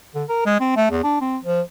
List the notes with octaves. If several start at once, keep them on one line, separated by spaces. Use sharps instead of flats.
D3
A#4
G#3
C4
A3
E2
D4
C4
F3